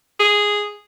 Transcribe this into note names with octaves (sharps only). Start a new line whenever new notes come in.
G#4